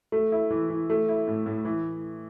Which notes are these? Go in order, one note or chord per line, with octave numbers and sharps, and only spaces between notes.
A3
E4
E3
E3
A3
E4
A2
A2
E3